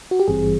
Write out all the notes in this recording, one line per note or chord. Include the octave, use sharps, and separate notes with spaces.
F#4
G4
G#1 G2 E3 G3 C4 G#4